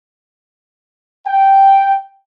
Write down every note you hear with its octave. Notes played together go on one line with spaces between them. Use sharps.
G5